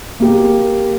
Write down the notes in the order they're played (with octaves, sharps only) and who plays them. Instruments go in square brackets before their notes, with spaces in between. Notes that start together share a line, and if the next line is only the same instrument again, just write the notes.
[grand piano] A#3 G4